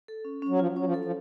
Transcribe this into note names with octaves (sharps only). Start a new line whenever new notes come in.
A4
C#4
C#4
F#3
F3 F4
F#3 C#4
F3
A4
F3